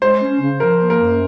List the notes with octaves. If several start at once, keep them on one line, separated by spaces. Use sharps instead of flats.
G#3 C5
C#4
C#3
F3 A#4
A#3
A#4
F#2